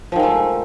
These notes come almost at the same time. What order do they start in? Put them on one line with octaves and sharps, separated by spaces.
F3 D#3 G#3 A3